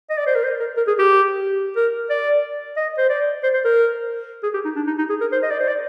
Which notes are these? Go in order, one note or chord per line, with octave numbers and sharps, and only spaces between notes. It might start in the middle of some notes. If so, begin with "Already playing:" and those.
D#5
D5
C5
A#4
C5
A#4
A#4
G#4
G4
A#4
D5
D#5
C5
D5
C5
C5
A#4
G#4
G4
D#4
D4
D#4
D#4
G#4
A#4
C5
D#5
D5
C5
D5